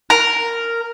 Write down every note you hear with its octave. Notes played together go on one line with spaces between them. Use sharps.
A#4